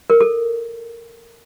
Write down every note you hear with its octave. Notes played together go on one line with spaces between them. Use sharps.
A#4
A4